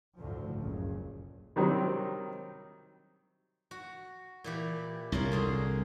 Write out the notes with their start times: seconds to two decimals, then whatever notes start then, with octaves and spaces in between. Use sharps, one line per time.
0.18 G1 D2 A2 D3 F3
0.59 F#1 C#2 C#3
1.56 C3 D#3 F#3 G3 C4
3.71 F#4
4.44 A#2 E3 G4
5.12 C2 C#4 F4 A#4
5.32 D3 G#4 C6